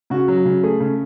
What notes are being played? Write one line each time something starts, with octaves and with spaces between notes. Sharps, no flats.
C#3 F#4
F#3
C#3
A3 G#4
C#3